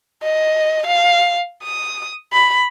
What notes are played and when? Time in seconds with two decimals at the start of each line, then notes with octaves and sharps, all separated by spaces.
0.22 D#5
0.87 F5
1.63 D#6
2.33 B5